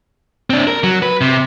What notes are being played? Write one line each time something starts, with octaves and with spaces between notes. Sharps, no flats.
C4 D4
A#4
F#3
B4
C3